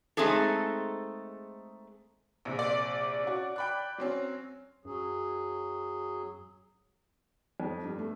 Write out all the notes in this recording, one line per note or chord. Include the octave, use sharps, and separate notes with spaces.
G#3 A3 C4 D#4 G#4 A4
A#1 C3
D5
C#4 F#4
G5 B5 F#6
F#3 C4 C#4
F#2 F#3 G#4
F2
G2
A3